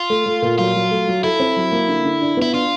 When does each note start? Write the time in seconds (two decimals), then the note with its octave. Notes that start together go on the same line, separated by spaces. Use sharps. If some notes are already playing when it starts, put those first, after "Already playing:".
Already playing: F4
0.10 A3
0.26 A3
0.42 A#2
0.58 F#3 F4
0.75 F#3
0.91 A3
1.07 F#3
1.23 E4 A4
1.40 C4
1.56 F#3
1.72 A#3
1.88 D3
2.05 D3
2.22 D4
2.37 B3 E4
2.54 D4 F4